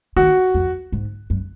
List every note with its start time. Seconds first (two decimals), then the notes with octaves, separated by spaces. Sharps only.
0.16 D#3 F#4
0.54 F2
0.92 G#2
1.30 F#2